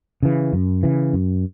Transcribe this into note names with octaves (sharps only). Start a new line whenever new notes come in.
C#3 E3
F#2
C#3 E3
F#2